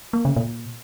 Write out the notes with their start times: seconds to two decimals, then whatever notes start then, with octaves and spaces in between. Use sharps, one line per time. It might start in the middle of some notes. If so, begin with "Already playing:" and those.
0.13 A#3
0.25 C#3
0.36 A#2